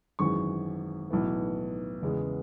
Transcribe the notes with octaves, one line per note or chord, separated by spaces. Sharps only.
G#1 F#2 E3 G#3 C#6
B1 A2 E3 B3
E2 C#3 G#3 B3